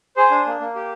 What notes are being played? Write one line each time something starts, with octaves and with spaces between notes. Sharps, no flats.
G#4 C5
D4
A#3
A#3
G4